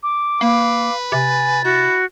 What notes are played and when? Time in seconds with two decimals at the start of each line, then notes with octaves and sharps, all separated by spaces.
0.03 D6
0.41 A#3 B4 F5
1.12 C3 G#5 A6
1.64 E4 F#4